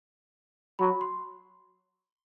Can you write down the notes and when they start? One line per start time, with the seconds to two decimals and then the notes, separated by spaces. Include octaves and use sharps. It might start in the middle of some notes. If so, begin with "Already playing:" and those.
0.79 F#3 B5
1.01 C6